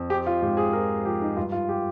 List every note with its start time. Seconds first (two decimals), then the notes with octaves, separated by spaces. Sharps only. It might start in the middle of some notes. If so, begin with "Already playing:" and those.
Already playing: F2
0.10 C4 G4
0.27 F4
0.42 G#2 G4
0.57 G#4
0.73 F3 A#4
1.05 F3 G4
1.22 D#4
1.37 G2 F4
1.52 F4
1.69 G4